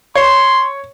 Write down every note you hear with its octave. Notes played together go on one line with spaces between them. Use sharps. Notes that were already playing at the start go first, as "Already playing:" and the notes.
C#5 C6